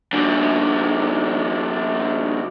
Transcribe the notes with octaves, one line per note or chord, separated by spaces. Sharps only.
F#2 D3